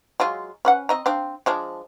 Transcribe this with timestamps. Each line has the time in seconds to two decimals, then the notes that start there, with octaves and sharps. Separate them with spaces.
0.20 F#3 G#3 F4
0.65 C#4 B4 F#5
0.89 C4 D#5 A#5
1.06 C4 D4 F5
1.46 F3 G#3 D4